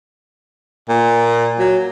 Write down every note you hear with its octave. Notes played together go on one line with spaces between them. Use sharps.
A#2
F#3